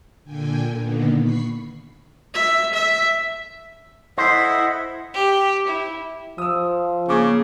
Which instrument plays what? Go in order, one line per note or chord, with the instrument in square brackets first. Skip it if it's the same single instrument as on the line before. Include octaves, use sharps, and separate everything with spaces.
[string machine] A#2 D3 G5 G#5
A#2 D3 D#3 A#3 B3
B5 C#6 B6 C7
[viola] E5
E5
[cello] E4 [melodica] A4 D#5 F#5 [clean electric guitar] C5
[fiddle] G4
E4
[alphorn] F3 [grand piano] D#6 E6
[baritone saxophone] C#3 [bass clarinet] A#3 [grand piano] C#6 D6 G#6